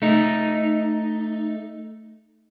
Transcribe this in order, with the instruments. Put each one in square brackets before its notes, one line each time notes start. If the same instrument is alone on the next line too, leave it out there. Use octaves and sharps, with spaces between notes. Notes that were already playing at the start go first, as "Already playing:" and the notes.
[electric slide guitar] A3 D#4